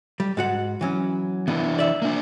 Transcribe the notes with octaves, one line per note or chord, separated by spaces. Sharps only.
G3
G#2 F#4 F#5
E3 F#3 C#4
E3 B3 D4 E4
D5 E5
A#3 D4